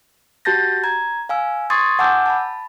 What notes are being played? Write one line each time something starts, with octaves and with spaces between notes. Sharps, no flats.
F#4 G4 A5 G6 A6 A#6
A#5 G#6
F5 G#5 E6
C6 C#6 D#6 G#6 A6
F#5 G#5 A5 D6 E6 G6
A5 B5